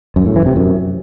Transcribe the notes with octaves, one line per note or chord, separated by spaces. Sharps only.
F#2
A2
E3
C3
F#2